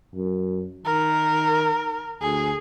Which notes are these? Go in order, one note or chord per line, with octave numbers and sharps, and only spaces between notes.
F#2
D#3 A#4
D2 G#4